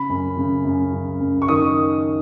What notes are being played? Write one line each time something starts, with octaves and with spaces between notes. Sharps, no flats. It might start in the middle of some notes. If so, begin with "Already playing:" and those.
Already playing: C#3 B5
F#2
C#3
F#2
C#3
F#2
C#6
D#3 D#6